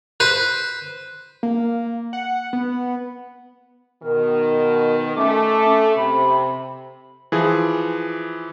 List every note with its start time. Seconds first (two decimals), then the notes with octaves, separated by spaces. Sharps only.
0.20 B4 C5
1.43 A#3
2.13 F#5
2.53 B3
4.03 B2 D#3 A#4
5.16 A3 C#4 D6
5.97 C3 B5
7.32 E3 F3 G#4